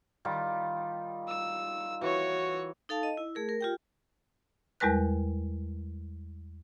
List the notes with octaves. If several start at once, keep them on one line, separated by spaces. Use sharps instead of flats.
D#3 G3 F4
E6
E3 F#4 C#5
D#4 A4 F5 A5
D#5
E4
A3 G#4 A#4
A#4
F4 G4 G5
E2 G3 G#3 A#4 B4 F#6